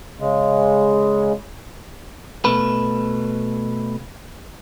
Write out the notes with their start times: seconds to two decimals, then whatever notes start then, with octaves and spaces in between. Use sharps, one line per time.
0.20 C#3 G#3
2.45 B2 A3 B4